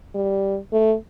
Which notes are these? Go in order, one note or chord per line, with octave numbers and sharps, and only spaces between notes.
G3
A3